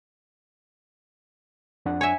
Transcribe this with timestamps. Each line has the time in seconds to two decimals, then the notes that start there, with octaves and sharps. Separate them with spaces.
1.86 F2 D4 F#5
2.01 C#5 E5 G#5